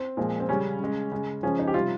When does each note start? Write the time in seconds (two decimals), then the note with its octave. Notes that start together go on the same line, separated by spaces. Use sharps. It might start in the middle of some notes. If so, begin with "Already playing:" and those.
Already playing: C4
0.17 A#2 F3 G#3
0.40 C4
0.49 C#3 G3 C#4
0.80 C#3 G#3
1.12 C#3 G#3
1.43 C#3 F3 G#3 C#4
1.59 D#4
1.67 G4
1.74 C3 G3 F4